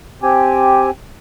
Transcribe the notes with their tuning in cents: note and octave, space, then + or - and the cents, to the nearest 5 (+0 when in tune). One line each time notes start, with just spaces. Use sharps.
C4 +5 G4 +0 G#5 +0